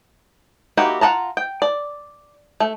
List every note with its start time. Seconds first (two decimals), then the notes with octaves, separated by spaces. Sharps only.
0.77 A#3 D#4 E4 F#4 G4
1.01 F4 F#5 A5 A#5
1.37 G5
1.62 D5
2.60 A3